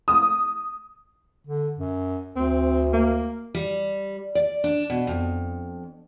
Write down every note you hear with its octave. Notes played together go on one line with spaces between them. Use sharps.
D#6
D3
F#2
D2 C4
A#3
G3
D5
D4
B2
F2